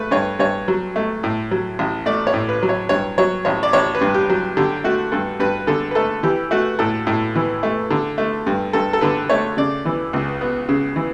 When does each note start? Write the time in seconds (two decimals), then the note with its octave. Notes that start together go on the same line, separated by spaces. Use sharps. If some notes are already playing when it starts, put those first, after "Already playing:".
Already playing: A3 B4
0.11 G2 C#5
0.39 G2 C#5
0.68 F#3
0.96 A3
1.24 A2
1.51 F#3
1.79 A1
2.06 A3 D5
2.27 C#5
2.34 A2
2.49 B4
2.62 F#3
2.69 C#5
2.89 G2 C#5
3.18 F#3 C#5
3.45 A1 C#5
3.63 D5
3.73 A1 C#5
3.95 B4
4.01 G2
4.14 G4
4.29 F#3
4.57 D3 G4
4.84 A3 F#4
5.12 G2 A4
5.40 G2 B4
5.67 D3 A4
5.91 B4
5.95 A3 A4
6.23 E3 G4
6.51 A3 F#4
6.79 A2 A4
7.07 A2
7.35 E3
7.63 A3
7.91 D3
8.18 A3
8.46 G2
8.73 G2 A4
8.93 A4
9.01 D3 B4
9.29 A3 C#5
9.57 C#3 D5
9.85 E3
10.13 C#2
10.41 B3
10.69 C#3
10.96 E3